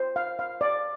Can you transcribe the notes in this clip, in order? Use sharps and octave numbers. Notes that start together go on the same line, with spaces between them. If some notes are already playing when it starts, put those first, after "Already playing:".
Already playing: C5
F5
F5
D5